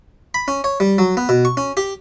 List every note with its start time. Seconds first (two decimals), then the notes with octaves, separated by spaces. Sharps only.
0.34 B5
0.48 C#4
0.64 C#5
0.80 G3
0.98 F#3
1.17 B3
1.29 B2
1.45 C#6
1.57 C#4
1.77 G4